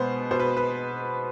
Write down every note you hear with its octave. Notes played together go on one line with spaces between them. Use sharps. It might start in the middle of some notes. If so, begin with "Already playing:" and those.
Already playing: B2 G#3 B3 C5
B2 C5
B4
B4